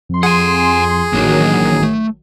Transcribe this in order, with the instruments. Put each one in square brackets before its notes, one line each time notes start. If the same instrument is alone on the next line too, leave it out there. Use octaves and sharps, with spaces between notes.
[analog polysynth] F2 C6
[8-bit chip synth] G#4 [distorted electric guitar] F#5 G#5
[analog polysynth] A1 D#3 F#3 [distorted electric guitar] A#3 D4
[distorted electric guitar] A3